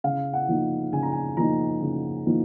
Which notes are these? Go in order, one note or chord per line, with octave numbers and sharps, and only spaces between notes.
C#3 F5
F#5
F3 A#3 D#4
C#3 G#5
A#5
G#5
F3 A#3 D#4 A#5
C#3
F3 A#3 D#4